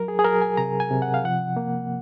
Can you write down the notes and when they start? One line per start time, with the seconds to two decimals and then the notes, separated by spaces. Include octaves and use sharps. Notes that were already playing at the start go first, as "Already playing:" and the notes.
Already playing: F#3 A#4
0.08 G#4
0.19 G#4
0.25 F#3 A#4
0.42 G#5
0.57 C3 A#5
0.80 G#5
0.91 C3
1.02 F#5
1.14 F5
1.24 F3 F#5
1.57 A#3